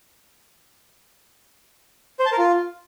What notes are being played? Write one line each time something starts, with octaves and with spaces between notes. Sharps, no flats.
C5
A5
A#4
F4